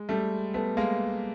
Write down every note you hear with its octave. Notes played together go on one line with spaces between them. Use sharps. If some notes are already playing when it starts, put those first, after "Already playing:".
Already playing: G#3
G3 A3
A3 B3
G#3 A#3